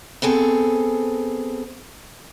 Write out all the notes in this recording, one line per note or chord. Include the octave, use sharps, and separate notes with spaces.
B3 C4 G#4 A4